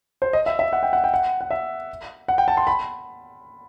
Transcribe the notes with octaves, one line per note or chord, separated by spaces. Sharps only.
C5
D#5
E5
E5
F#5
G5
F#5
G5
F#5
F#5
E5
F#5
G5
A5
C6
B5